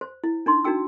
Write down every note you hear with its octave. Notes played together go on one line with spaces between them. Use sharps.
C5
E4
D4 D#4 C6
D4 D#4 F#4 G5 E6